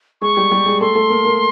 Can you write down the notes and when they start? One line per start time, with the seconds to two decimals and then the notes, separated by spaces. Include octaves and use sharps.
0.22 G#3 G#4 C#6
0.37 G3 G4
0.51 G3 G4
0.66 G#3 G#4
0.81 A3 A4 C6
0.95 A3 A4
1.10 A#3 A#4
1.25 A#3 A#4